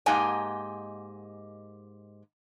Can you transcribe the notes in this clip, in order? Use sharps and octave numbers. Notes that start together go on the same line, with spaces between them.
G#2 A#3 G4 D#5 G#5 A#5